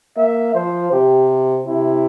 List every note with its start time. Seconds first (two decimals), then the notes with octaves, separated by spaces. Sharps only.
0.17 A#3 E5
0.55 F3 C5
0.92 C3 G4
1.66 C3 E4